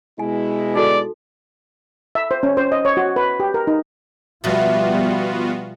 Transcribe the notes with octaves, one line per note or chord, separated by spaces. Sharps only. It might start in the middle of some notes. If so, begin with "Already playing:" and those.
B2 G#3 E4 G#5
D#4 F#4 A4 D5
E5
C5
C#4
C5
D#5
C#5
F#4
B4
G4
A#4
D#4
B2 F3 G3 A3 B3 F4 F#4